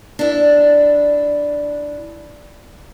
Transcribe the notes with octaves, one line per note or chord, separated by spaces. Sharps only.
D4 E4